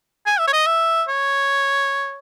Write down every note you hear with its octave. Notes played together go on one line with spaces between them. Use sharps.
G#5
E5
C#5
D#5
E5
C#5